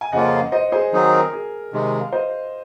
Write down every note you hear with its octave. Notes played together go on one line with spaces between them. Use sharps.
G#5
F2 C#3 F3 A#3 F4 D#5 F#5
C5 D#5
G#4 C5
D#3 F#3 C4 D#4 G#4
A#4
G#4
C3 D#3 G#3
F5
C5 D#5